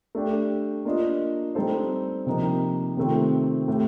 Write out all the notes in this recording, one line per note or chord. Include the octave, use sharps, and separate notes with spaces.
A3 D4 G4
A#3 D4 F4 A#4 D#5
G3 C4 D#4 A4 C5
C3 F3 A#3 D#4
C3 D#3 A3 C4 F4
A2 A3 C4 G4